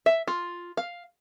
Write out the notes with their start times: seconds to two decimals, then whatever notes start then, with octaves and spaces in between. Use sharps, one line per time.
0.06 E5
0.28 F4
0.77 F5